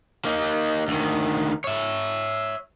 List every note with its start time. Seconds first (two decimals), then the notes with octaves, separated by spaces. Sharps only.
0.25 A#3 D#4
0.88 D2 D#3
1.64 C#5 E5